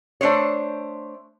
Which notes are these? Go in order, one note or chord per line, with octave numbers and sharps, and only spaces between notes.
A3 D4 C5 C#5